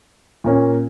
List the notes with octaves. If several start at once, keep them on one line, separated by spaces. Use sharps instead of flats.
A#2 A#3 C#4